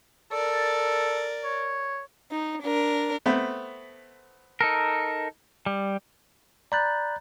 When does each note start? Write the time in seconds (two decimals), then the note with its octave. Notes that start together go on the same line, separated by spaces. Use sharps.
0.32 A4 A#4 D5
1.44 C#5
2.32 D#4
2.62 D4 A#4
3.26 A3 B3 C4
4.61 D#4 A4 A#4
5.66 G3
6.72 D5 A#5 B5 F#6 G6 A6